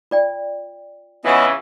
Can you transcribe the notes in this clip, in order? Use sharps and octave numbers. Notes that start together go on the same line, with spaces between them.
F4 D5 G5
C#3 E3 B3 C#4 F4 D#5 F#5 E6